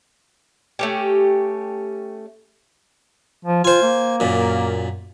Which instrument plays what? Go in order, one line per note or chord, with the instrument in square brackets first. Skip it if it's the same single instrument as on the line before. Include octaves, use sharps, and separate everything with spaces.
[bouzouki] A3 C#4 G4
[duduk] F3
[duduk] F4 [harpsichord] C5 G#5
[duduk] A#3
[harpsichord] F#2 A#2